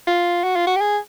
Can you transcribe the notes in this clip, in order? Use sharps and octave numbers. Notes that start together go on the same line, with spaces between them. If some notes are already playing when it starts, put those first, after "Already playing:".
F4
F#4
F4
F#4
G4
G#4